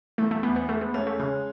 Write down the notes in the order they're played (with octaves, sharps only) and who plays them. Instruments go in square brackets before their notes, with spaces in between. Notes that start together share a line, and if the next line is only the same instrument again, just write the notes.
[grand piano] E3 [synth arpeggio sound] A3
[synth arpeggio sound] A3
[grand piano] E2 [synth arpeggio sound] B3
[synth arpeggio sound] B3
[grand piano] G#3 [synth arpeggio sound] A3
[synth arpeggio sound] B3
[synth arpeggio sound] A3 [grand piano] C#4
[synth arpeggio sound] A3
[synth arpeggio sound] C#3 [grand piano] G#3